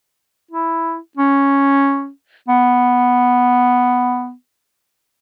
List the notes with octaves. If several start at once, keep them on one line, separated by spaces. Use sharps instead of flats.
E4
C#4
B3